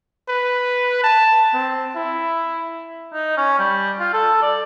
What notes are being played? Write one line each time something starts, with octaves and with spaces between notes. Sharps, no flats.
B4
A5
C4
E4
D#4
C#4
G3
F4
A4
D5